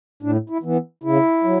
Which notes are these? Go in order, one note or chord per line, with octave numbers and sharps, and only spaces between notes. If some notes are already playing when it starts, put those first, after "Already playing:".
A2 D4
E4
E3 B3
C#3 E4
F#3